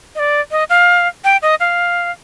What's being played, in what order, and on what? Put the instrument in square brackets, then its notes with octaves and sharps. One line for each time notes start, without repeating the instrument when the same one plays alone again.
[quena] D#5
D5
D#5
F5
G5
D#5
F5